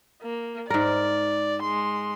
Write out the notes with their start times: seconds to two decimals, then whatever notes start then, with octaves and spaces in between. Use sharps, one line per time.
0.22 A#3
0.70 G#2 A#4 D5
1.63 G#3 C6